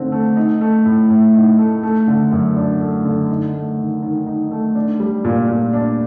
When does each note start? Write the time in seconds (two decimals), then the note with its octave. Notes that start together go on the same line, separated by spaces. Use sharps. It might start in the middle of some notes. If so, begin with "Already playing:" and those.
Already playing: D3 A3 C4 D#4
0.12 A3
0.36 D#4
0.61 A3
0.86 A2
1.10 A2
1.34 D#4
1.59 A3
1.83 A3
2.08 D3
2.31 F#2
2.56 D4
2.81 A3
3.05 D3
3.29 D#4
3.54 A3
3.78 D#3
4.02 D#3
4.27 D#4
4.51 A3
4.75 D4
5.00 G3
5.25 A#2
5.49 A#2
5.73 D4